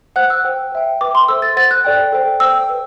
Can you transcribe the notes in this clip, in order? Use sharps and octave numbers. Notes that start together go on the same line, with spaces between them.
C5 F#5 F#6
E6
C5 G5
C5 E5 G5
B4 E5 G5 D6
C6
A4 C5 E5 E6
A6
C5 F#5 A6
F#6
A4 D5 G5
A4 C5 G5
C5 G5 E6
B4